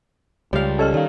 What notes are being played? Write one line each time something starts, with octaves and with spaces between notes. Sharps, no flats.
C#2 G3 C#5 F5
C#4 G4 A4 D#5 F6
D#3 D5 F5